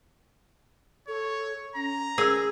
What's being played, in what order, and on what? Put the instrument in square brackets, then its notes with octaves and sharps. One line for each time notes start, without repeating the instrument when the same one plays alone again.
[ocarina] A4 [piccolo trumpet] C#5
[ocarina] C#4 [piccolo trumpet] A#5
[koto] G#4 [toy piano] A#4 E6